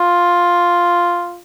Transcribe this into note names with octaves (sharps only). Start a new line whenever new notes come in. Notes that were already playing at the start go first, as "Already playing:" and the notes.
Already playing: F4